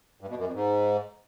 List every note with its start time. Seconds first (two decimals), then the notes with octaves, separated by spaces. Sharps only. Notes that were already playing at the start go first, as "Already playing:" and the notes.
0.21 G2
0.29 B2
0.37 F#2
0.46 F2
0.54 G#2